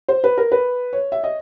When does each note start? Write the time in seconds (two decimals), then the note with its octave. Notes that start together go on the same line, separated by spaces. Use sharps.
0.08 C5
0.24 B4
0.38 A#4
0.52 B4
0.93 C#5
1.12 E5
1.24 D#5